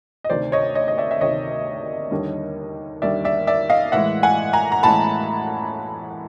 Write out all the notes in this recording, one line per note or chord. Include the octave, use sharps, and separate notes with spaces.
D#5
D2 C3 D#3 C5 D5
C#5 D#5
C#5 D#5
D#5
D5 E5
E5
D2 C3 D#3 C#5 D#5
D#2 D3 G3
D#2 D3 G3 D5 E5
D5 E5
D5 E5
D#5 F5
A2 E3 G#3 E5 F#5
F#5 G#5
G#5 A#5
A#5
A2 E3 G#3 A5 B5